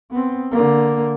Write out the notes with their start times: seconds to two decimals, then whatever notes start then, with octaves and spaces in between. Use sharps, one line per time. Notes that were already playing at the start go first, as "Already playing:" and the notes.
0.11 B3 C4
0.51 D3 A#3